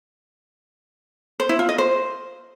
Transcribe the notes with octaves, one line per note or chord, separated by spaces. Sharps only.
C5
E4
F4
D#5
C5